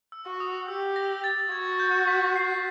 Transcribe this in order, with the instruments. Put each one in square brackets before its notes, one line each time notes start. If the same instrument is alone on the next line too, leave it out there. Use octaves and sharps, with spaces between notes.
[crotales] E6
[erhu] F#4
[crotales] D#6
[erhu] G4 [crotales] E6
[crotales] A#6
A6
[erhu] F#4 [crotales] G#6
[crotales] G6
B6
C7